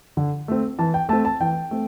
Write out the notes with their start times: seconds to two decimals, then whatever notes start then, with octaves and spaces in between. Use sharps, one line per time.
0.17 D3
0.48 A3 C4
0.79 E3 A5
0.94 G5
1.09 A3 C4 A5
1.25 A5
1.40 E3 G5
1.71 A3 C4